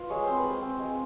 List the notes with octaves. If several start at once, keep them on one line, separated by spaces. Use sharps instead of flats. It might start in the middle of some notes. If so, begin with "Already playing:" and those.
Already playing: F4 B4
G#3 C#5
C4 C5
B4
G#3
C5
C4
G#3